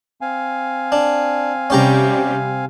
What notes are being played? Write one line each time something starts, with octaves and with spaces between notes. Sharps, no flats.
C4 F5 G#5
D4
C3 G3 C#4 G4 A#5